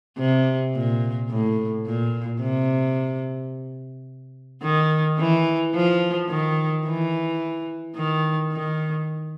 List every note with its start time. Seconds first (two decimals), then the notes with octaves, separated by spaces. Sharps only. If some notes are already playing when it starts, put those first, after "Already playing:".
0.18 C3
0.75 A#2
1.29 A2
1.86 A#2
2.41 C3
4.63 D#3
5.19 E3
5.74 F3
6.29 D#3
6.86 E3
7.96 D#3
8.53 D#3